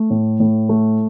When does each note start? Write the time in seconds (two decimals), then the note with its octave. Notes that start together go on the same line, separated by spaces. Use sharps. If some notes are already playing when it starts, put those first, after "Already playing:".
Already playing: A3
0.10 A2
0.40 A2
0.69 A3